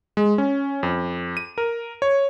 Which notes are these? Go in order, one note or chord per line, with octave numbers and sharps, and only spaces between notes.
G#3
C#4
F2
D#7
A#4
C#5